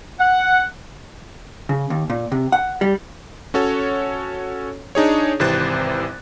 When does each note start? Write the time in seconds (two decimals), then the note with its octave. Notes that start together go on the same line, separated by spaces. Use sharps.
0.19 F#5
1.69 C#3
1.90 D#2
2.10 A#2
2.32 C3
2.52 F#5
2.81 G3
3.54 C#4 F#4 A4 C#5
4.95 D4 D#4 G#4 C#5
5.39 G#1 C3 E3 C5 F#6 A6